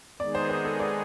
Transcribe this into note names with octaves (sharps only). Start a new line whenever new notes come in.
D#3 G#3 B3 D#4 G#4 D5
C5
C5
A4
D5